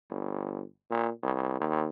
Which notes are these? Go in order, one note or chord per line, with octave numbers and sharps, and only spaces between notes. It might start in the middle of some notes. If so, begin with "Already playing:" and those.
G1
A#2
C2
D#2